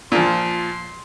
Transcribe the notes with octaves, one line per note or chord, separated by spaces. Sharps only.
A#2 F3 C6